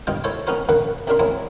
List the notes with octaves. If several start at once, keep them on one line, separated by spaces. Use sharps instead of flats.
B1 G2 G3 F4 D#5 G5
E4 A4 C5 C#5
B3 C#4 D#4 F#4 A#4 C5
A#1 F#2 A#3 B4 F#5
B1 F#2 D4 A#4 E5 C6
F#3 G#3 A#3 C4 E4